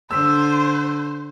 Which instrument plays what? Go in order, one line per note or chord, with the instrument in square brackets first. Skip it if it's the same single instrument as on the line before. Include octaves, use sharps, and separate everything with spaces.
[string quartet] D3 [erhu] C5 [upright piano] E6